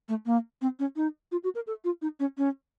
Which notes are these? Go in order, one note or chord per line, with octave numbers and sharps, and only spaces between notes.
A3
A#3
C4
C#4
D#4
F4
F#4
A#4
A4
F4
D#4
C#4
C#4